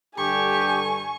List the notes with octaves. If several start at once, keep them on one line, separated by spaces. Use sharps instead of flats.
G2 D3 G4 A4 G#5 C#6